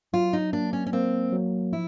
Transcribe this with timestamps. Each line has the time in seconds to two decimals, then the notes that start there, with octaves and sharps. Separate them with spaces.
0.13 F#3 F4
0.33 D#4
0.53 A#3 D4
0.73 C#4
0.87 C#4
0.93 A#3 C4
1.33 F#3
1.73 F3 E4